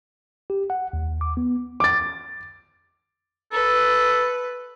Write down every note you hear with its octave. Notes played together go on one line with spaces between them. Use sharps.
G4
F#5
D#2
D6
B3
D6 A6
A4 B4